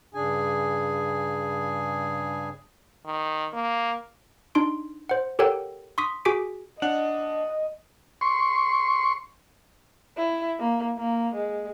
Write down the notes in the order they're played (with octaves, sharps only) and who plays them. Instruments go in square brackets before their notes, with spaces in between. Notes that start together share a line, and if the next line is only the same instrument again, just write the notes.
[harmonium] G2 C#3 D4 G#4 G#5
[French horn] D#3
A#3
[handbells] D4 D#4 C6 D7
C5 F#5
G4 A4 A#4 C#5 F#5 G5
C6 C#6 D#6 B6
F#4 G#4 G#5 D6 B6 D7
[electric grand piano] D4 [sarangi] D#5 [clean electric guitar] F#5
[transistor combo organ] C6 C#6
[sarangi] E4
A#3
A#3
G#3